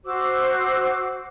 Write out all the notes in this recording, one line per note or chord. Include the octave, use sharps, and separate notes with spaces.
F#4 C5 D6 E6